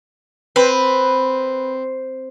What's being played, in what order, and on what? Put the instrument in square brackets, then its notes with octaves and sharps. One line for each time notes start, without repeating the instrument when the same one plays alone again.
[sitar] C4 [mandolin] B4